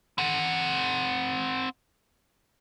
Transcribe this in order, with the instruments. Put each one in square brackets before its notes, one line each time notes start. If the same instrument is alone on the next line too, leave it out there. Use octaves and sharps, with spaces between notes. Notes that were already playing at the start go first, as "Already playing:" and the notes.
[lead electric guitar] C4 F#5